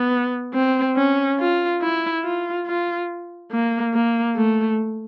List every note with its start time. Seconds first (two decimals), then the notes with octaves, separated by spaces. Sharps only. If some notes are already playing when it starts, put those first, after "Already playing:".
Already playing: B3
0.54 C4
0.96 C#4
1.39 F4
1.81 E4
2.24 F4
2.67 F4
3.51 A#3
3.94 A#3
4.36 A3